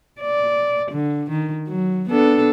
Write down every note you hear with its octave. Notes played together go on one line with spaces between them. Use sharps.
D5
D3
D#3
F#3
B3 D4 A4